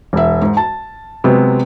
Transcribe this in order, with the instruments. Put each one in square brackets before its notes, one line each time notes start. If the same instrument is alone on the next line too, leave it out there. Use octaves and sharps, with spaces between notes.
[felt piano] E1 E5
G#2
A5
C3 F#3 G#3 B3